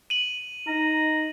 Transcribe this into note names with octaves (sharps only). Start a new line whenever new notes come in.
D#7 F#7
D#4 A#5